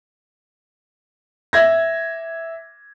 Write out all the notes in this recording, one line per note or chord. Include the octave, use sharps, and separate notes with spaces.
E5 G#6 A#6